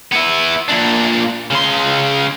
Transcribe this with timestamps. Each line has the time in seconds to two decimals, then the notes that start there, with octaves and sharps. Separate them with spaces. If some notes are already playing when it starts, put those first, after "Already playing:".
0.12 B3 E4
0.69 A#2 D4
1.51 C#3 C6